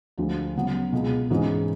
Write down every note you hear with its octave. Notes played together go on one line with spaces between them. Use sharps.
D2 D3 F3 G#3
C#3 F#3 B3
C#2 B2 G#3
G#2 E3 G#3 C#4